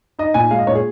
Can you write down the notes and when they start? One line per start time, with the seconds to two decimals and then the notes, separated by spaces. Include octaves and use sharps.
0.19 D#4 D#5
0.34 A#2 G#5
0.51 G#3 F5
0.59 D#5
0.67 A#2 C#5
0.75 G#4